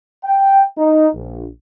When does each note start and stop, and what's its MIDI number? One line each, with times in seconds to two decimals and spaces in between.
0.24 0.64 79
0.78 1.09 63
1.14 1.46 34